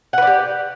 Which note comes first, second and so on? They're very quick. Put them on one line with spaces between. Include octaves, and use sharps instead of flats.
F#5 B4 D5 G4